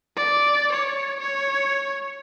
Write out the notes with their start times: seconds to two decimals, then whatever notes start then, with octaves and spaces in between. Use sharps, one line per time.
0.16 D5
0.72 C#5
1.20 C#5